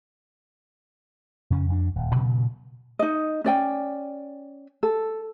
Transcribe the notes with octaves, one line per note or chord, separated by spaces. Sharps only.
F2 C#3 C#4
F2 D4
D#1
G2 A#2 C#3 F#3
D#4 D#5
C#4 D5 G5 G#5
A4